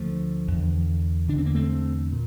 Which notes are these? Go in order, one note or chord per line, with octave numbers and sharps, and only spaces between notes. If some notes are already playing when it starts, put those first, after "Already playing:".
Already playing: D2 D3 F3 A3
E2 D3
E2 D3 D4
C4
A#3
A3 C4
A#2